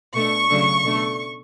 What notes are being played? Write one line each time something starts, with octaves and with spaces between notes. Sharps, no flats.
B2 A3 D4 C#6
C#3 F#3 A3 D4
B2 A3 D4